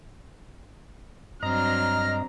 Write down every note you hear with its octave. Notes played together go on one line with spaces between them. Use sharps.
G2 F#3 C4 D4 D#5 A#5 F6